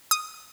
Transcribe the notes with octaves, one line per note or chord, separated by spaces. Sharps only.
D#6